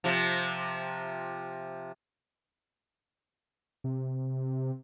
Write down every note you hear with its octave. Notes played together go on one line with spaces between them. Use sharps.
C3 F3
C3